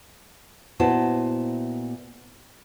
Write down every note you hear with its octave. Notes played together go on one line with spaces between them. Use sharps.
A#2 B3 E4 F#4 C5 A5